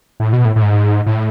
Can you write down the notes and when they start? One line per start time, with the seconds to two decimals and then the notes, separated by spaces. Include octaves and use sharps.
0.20 A2
0.33 B2
0.45 A2
0.56 A2
0.62 G#2
1.06 A2